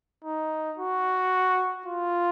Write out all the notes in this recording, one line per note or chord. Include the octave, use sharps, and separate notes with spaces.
D#4
F#4
F4